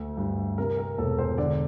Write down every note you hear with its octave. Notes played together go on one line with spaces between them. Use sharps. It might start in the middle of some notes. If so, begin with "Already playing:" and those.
Already playing: D2 A3
G2
C3 A#4
A#4
E1 A4
C5
D3 D5